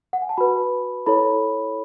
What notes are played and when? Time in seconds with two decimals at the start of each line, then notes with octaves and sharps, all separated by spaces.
0.13 F#5
0.22 G#5
0.29 A5
0.37 F#4 B4 B5
1.06 E4 A4 C#5 B5